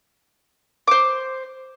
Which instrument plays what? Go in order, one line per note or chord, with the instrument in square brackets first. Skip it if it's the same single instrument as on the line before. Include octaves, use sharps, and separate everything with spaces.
[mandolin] C5 D6